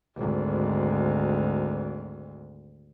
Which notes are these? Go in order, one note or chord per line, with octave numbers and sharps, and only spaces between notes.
G#1 D2